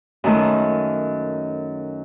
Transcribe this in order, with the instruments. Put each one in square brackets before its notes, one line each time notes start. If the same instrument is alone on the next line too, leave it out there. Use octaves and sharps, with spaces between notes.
[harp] F#2 D#3 A3